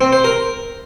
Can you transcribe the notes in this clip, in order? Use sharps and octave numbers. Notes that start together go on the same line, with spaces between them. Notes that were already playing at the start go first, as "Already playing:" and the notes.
C4
C5
A#4